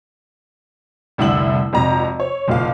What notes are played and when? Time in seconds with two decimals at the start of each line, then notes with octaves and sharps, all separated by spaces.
1.18 F1 C2 D3 E4 E6 F#7
1.73 G#1 F2 C3 A#5
2.20 C#5
2.48 F#1 B1 A#2 F5